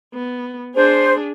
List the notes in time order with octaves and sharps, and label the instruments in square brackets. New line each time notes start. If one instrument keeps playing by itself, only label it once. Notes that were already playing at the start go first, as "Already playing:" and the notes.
[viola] B3
[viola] D4 G#4 [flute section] C5